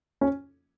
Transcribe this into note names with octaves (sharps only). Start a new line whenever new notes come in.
C#4